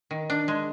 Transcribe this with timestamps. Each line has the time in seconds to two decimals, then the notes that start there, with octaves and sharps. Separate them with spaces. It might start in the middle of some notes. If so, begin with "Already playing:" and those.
0.11 D#3
0.30 D4
0.48 G#3